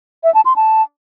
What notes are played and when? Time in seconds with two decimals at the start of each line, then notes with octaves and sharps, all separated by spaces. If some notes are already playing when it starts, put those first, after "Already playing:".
0.24 E5
0.34 A5
0.45 C6
0.56 A5